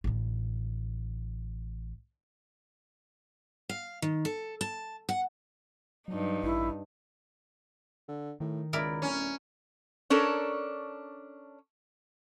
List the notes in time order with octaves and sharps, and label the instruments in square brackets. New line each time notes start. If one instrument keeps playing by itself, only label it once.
[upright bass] A1 D3
[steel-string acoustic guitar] F5
D#3
A4
A5
F#5
[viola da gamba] G2 D#4 [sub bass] F#3
[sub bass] A1 [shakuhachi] E4
[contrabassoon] D3
[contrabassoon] A2 [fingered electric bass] D#3
[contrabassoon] C#2 [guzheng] E4 A#4 D5
[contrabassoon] D1 [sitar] C#4
[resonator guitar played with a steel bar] C#4 D4 A4 A#4